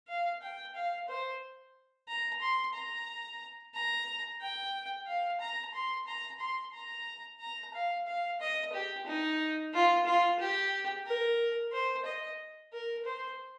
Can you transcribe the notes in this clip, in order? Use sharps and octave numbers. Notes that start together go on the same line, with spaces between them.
F5
G5
F5
C5
A#5
C6
A#5
A#5
G5
F5
A#5
C6
A#5
C6
A#5
A#5
F5
F5
D#5
G4
D#4
F4
F4
G4
A#4
C5
D#5
A#4
C5